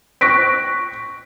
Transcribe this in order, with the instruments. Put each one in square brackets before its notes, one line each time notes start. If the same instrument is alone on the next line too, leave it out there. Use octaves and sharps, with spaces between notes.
[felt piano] C#6 F#6 A#6 B6 D7